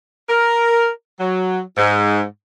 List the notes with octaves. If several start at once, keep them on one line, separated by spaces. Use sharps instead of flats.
A#4
F#3
G#2